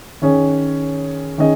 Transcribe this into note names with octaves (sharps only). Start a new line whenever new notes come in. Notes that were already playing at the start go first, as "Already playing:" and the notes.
D#3 C#4 G#4 C#5
D#3 C#4 G#4 D#5